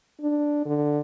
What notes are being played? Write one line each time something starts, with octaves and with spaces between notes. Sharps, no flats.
D4
D3